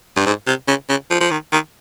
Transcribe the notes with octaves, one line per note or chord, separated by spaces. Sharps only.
G2
G#2
C3
C#3
C#3
F3
F3
D#3
D#3